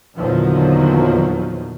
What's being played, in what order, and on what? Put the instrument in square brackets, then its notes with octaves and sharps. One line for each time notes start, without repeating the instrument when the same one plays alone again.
[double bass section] E2 A#2 D3 D#3 F3 F#3